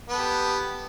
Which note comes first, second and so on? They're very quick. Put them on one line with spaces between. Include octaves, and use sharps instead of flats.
B3 A4 G4